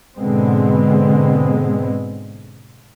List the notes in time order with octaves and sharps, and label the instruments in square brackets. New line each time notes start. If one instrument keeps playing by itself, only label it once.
[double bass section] G#2 B2 D3 G#3 B3 C4